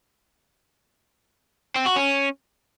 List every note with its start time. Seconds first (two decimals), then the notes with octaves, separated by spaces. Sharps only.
1.76 C4
1.86 F#4
1.96 C#4